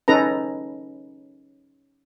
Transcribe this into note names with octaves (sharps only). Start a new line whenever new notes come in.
C#4 D#4 A4 B4 A#5